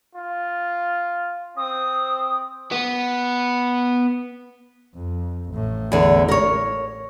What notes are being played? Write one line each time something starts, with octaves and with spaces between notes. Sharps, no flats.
F4
C4 D#6
B3
F2
A1 A2
E2 D3
A#4 C#5